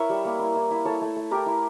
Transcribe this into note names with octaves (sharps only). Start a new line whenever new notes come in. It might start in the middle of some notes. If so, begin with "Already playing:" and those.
Already playing: E4 A#4 C#5 E5
G3
A#3
E4
E4
E4
E4 A4 C#5
A3
A3
E4 G4 A#4
E4